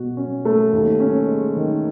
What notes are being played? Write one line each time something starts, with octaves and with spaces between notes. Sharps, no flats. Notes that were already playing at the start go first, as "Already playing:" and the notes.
Already playing: B2 F#4
C#4
A3
D#2
C#4
G#3
D#3